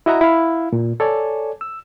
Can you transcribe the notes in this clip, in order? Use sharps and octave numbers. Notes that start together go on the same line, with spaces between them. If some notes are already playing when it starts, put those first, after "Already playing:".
E4 F#4 D#5 E5 F#5 A#5
E4 F5
A#2
A4 C#5 D5 G#5
E6